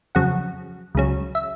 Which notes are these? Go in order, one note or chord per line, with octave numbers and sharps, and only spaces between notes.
F2 C#3 F#3 F#5
C#2 C#3 F#3
E5